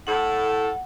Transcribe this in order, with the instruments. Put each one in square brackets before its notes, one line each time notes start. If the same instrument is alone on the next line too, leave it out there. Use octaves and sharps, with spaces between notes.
[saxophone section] A2 A4 [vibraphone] F#5